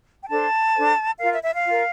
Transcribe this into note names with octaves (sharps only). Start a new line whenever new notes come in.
G5
D4 A4 C5 A5
D4 A4 C5
F4 A#4 F5
E5
E5
F5
F4 A#4